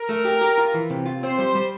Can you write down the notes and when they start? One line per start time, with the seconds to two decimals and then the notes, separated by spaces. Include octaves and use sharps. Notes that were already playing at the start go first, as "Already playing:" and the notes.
Already playing: A#4
0.09 A3
0.25 G4
0.41 G4
0.58 F4
0.74 E3
0.90 C3
1.06 F4
1.23 C4 C5
1.39 G3
1.55 G3